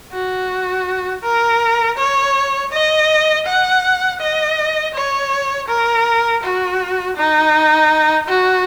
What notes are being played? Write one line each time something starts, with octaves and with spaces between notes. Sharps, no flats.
F#4
A#4
C#5
D#5
F#5
D#5
C#5
A#4
F#4
D#4
F#4